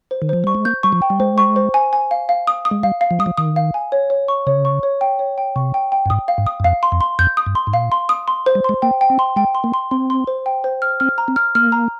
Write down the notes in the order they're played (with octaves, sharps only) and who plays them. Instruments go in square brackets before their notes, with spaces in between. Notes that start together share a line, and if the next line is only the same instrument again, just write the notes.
[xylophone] C5
[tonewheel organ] D#3
[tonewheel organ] F3 [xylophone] C5
[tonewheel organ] G3 [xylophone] C#6
[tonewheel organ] G#3
[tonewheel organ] A#3 [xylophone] G6
[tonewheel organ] G3 [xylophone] C#6
[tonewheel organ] F3
[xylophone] G5
[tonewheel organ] G3
[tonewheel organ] G#3 [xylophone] C5
[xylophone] C#6
C5
G#5
G#5
F5
F5
D#6
D#6
[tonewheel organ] G#3
[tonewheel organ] G3 [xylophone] F5
[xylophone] F5
[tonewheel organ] F3
[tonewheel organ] G3 [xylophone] D#6
[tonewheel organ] F3
[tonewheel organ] D#3 [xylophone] D#6
[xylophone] F5
G#5
C#5
C#5
C#6
[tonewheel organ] C#3 [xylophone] C#5
[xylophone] C#6
C#5
G5
C#5
G5
[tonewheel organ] C3 [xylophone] C#6
[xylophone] G5
G5
[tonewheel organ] G2
[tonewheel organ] G#2 [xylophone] D#6
[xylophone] F5
[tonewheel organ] G#2
[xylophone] D#6
[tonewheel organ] G2
[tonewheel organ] F2 [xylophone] F5
[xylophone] C6
[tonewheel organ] F2
[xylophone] C6
[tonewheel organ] F2 [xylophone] G6
[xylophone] D#6
[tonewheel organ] G2
[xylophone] C6
[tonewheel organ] G#2
[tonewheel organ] A#2 [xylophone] F5
[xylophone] C6
D#6
C6
C5
[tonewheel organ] G3
[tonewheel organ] G#3 [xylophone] C6
[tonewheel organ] A#3 [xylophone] G5
[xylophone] G5
[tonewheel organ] C4
[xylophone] C6
[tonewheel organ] G#3 [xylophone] G5
[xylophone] C6
[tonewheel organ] A#3
[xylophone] C6
[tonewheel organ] C4 [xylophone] C6
[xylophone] C6
C5
G5
C5
F6
[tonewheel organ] C4 [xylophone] F6
[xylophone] A#5
[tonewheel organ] C4
[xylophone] F6
[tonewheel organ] A#3 [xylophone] F6
[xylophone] A#5